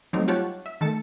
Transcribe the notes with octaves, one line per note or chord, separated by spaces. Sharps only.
F#3 G3 A3 C4 D#4
F4 G4 C#5 F#5 A5
E5
D#3 A3 A5 C#7